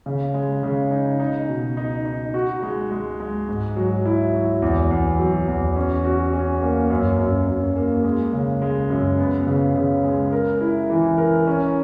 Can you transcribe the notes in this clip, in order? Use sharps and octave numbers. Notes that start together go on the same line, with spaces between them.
C#3
G#3
C#3
D#4
D#4
B2
D#4
D#4
F#4
G#3
G#3
G#3
G#2
F#3
E4
F#3
E2
E2
F#3
E2
C#4
F#4
C#4
A#3
F#2
F#2
F#2
A#3
G#3
C#3
G#3
F#2
B3
C#3
C#3
G#3
A#4
E4
E3
A#4
C#4